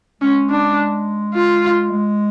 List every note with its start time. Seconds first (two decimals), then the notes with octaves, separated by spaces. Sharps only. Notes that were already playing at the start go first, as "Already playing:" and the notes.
0.22 G#3 C#4
0.50 D4
1.34 F4
1.91 G#3